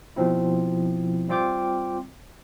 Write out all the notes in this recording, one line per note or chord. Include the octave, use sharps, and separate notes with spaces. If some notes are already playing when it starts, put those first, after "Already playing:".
B2 F3 C4 E4
G3 C4 F4 G5 D6 G6